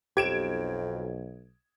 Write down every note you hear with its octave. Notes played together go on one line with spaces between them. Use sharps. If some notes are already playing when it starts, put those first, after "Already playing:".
B1 F2 G4 G#6 D7 E7